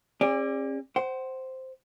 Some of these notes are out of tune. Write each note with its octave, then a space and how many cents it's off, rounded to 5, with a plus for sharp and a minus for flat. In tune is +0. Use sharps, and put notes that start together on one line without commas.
C#4 -45 G#4 -35 D5 +0
C5 +0 F#5 +35